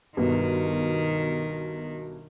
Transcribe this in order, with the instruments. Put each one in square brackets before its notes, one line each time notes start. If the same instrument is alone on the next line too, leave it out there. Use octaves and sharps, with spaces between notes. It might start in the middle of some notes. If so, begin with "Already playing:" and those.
[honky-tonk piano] G1 B2 [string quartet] D#3